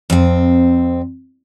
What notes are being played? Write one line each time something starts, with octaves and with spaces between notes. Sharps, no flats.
F2 C4